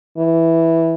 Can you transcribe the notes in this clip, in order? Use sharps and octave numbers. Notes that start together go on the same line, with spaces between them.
E3